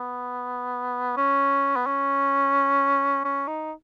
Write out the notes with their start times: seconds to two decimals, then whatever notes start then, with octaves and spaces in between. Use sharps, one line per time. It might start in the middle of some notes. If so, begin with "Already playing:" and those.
Already playing: B3
1.17 C#4
1.76 B3
1.86 C#4
3.24 C#4
3.48 D#4